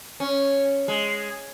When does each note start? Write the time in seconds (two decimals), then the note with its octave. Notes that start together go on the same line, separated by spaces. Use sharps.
0.20 C#4
0.88 G#3